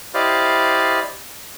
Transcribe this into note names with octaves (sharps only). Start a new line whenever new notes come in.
E4 G4 C5 D5 D#5 F5